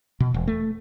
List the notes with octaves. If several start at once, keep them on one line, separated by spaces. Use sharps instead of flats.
B2
E1
A3